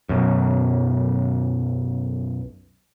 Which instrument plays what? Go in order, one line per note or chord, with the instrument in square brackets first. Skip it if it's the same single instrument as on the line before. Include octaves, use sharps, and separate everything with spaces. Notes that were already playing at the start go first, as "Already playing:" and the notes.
[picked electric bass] B1 F#2